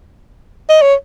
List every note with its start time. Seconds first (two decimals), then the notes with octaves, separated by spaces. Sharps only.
0.69 D#5
0.82 C#5